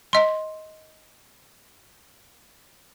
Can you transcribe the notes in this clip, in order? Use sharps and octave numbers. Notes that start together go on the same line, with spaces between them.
D#5 C6